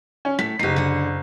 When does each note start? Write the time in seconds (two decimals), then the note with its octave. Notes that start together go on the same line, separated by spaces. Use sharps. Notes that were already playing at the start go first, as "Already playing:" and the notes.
0.25 C#4
0.39 A2 B6
0.59 F#1 D#4 G4 C7
0.76 D3 F#5